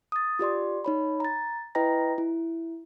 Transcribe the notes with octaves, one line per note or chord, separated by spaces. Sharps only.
D#6 A6
F4 G4 D5 C6
D#4 C#5 B5
A#5 A6
E4 B4 D#5 G5 A#5 A#6
E4